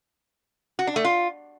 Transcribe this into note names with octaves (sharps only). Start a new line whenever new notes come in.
F#4
D4
A3
F4